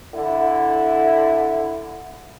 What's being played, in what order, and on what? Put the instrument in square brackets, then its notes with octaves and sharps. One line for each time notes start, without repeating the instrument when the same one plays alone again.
[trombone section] D3 E4